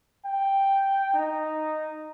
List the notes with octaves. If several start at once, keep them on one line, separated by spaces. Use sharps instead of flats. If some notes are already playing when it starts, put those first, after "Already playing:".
G5
D#4